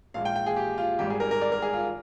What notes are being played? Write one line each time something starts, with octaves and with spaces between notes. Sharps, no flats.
A#1 A#2 G#3 F5
G5
G5
G#4
G4
F4
G#1 G#2 G3 G4
G#4
A#4
A#4
D5
A#4
G#4
F4